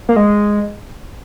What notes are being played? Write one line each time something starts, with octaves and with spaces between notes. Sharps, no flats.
A#3
G#3